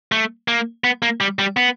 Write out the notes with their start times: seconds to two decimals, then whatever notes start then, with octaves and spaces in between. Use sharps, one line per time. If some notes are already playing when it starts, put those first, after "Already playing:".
0.12 A3
0.48 A#3
0.84 B3
1.02 A#3
1.21 G3
1.39 G3
1.57 B3